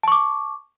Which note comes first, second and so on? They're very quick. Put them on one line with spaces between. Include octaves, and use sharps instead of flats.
A5 C#6 D6